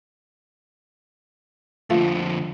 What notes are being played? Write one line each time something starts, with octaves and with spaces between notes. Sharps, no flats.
F2 D3 A3 F4